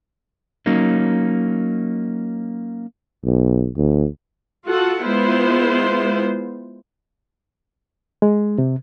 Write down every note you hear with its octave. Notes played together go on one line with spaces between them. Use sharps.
F#3 A#3 C#4 D#4
B1
D2
F4 F#4 A4 F#5
G#3 B3 E4 F4 C5
G#3
C3